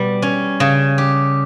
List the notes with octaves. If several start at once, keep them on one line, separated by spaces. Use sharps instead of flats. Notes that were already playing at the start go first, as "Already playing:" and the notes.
Already playing: B2 G3
C#4
C#3
G4